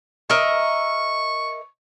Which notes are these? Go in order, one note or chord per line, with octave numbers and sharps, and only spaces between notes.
A#4 D#5 E5 C#6